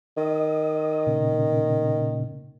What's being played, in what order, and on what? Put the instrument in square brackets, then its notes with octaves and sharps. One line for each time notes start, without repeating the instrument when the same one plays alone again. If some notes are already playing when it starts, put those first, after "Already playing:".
[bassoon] D#3 [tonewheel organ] D#5
[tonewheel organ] A#2 C#3